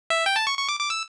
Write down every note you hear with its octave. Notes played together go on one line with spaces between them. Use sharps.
E5
G5
A5
C#6
C#6
D6
D6
E6